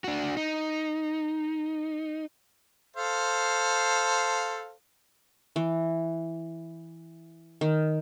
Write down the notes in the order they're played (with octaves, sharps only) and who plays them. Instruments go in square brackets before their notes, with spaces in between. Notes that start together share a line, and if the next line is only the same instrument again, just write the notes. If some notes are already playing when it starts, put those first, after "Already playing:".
[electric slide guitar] D4 F#4
D#4
[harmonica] A4 C5 F5
[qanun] E3
D#3